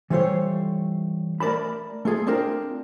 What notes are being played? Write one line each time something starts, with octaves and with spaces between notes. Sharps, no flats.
E3 G3 A3 F4 C5 C#5
A3 A#4 D5 A5 B5
A3 F4 G#4 A4
A3 C4 D4 F4 A#4